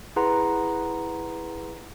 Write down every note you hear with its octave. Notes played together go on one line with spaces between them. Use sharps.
E4 G#4 B4 F#5 A#5 C6